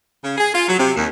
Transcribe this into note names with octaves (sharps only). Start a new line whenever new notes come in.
C#3
G#4
F4
F#3
C3
D#2